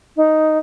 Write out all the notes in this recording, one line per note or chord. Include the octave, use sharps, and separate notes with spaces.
D#4